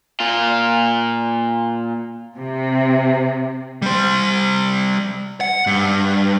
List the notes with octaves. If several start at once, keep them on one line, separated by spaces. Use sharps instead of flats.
A#2 F4
C3
G3 C5
F#5
G2